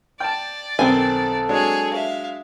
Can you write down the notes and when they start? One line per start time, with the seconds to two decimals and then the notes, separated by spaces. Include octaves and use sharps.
0.20 D5 G5 A5
0.79 B1 D#3 C4 A4 G#5
1.49 F#3 G#3 D4 G#4 C#5
1.94 E5 F5